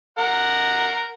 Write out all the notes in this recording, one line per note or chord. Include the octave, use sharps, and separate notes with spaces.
A#4 F#5